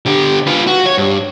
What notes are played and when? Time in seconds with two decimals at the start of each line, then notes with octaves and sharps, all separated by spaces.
0.06 D3 G4
0.47 F4 B4
0.67 F#4
0.86 C#5
0.98 G2